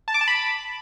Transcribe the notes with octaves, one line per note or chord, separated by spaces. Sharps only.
A5
D6
A5
B5